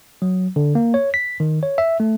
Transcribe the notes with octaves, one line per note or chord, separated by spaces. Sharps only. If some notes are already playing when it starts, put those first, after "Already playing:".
F#3
D3
A#3
C#5
B6
D#3
C#5
E5
A3